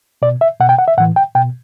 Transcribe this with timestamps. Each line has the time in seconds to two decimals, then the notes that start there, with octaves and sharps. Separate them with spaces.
0.22 B2 D5
0.41 E5
0.60 B2 F#5
0.69 G5
0.79 F#5
0.88 E5
0.98 A2 E3 F#5
1.16 G5
1.35 B2 G5